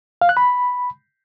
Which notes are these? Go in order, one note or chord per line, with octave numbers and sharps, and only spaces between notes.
F5
F#6
B5